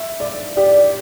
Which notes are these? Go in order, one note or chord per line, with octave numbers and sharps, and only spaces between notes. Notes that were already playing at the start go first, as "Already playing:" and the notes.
Already playing: E5
D5
G4 D5